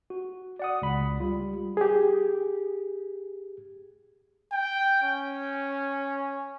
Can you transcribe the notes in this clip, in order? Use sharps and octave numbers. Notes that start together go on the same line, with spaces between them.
F#4
D5 F#5 D#6
C#2 B5
G3 F4
G4 G#4
G5
C#4